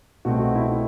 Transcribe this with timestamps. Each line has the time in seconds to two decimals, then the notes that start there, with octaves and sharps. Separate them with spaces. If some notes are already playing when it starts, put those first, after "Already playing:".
0.25 C2 B2 A3 C4 F#4
0.39 F#4
0.55 E4
0.70 E4